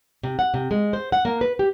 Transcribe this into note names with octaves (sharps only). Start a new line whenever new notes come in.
C3
F#5
C3
G#3
C5
F#5
A#3
B4
G4